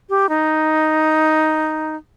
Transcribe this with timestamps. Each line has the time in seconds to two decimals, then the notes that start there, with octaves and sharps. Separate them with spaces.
0.09 G4
0.29 D#4